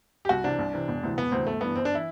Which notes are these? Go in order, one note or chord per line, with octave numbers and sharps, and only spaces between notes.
G4
C2 F#4
C3 E3 D4
C2
C3 E3
E1
D2 C3 E3
E1 B3
D2 C3 E3 C4
G1 A3
G2 E3 B3
G1 C4
D4
E3 E4